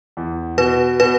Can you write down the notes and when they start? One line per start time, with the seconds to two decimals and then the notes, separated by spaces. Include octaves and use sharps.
0.17 E2
0.58 B2 B4
1.00 B2 B4